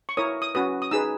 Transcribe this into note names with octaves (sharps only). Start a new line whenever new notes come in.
C#6
E4 A#4 C#5 D#6
D#6
C#4 F#4 B4 D#6
D#6
D#4 G#4 B4 E6